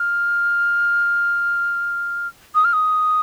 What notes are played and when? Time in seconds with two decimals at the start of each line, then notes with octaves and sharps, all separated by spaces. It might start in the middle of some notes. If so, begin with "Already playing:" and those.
Already playing: F6
2.55 D#6
2.65 F6
2.73 D#6